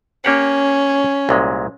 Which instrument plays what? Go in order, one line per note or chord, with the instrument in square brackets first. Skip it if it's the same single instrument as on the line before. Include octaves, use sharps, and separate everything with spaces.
[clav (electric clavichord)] A#3 G4 F#5 [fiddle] C#4
[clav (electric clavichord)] C2 A#2 G#3